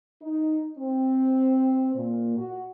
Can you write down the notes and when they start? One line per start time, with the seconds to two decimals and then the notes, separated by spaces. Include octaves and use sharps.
0.21 D#4
0.78 C4
1.95 A#2
2.37 F#4